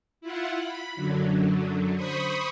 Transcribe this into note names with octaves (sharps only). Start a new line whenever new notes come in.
E4 F4 F#5
B5
F#2 D3 F#3
C5 B5 C#6 D#6